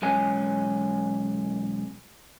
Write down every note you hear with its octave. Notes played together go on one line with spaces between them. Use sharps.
B1 E2 G#3 C#4 G#5